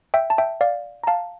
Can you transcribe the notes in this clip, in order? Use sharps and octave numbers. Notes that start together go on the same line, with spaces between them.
E5 G5
A5
E5 G5
D5 F5
A#5
F5 A5